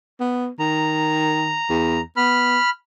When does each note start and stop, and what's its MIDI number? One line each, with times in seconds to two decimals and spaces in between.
0.20 0.48 59
0.59 1.59 51
0.59 2.01 82
1.69 2.00 40
2.17 2.58 59
2.17 2.70 83
2.17 2.70 89